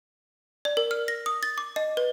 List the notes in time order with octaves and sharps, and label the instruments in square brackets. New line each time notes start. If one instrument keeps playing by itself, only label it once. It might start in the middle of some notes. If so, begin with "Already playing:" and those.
[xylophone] D5
A#4
F6
A#6
D#6
A6
D6
D#5
B4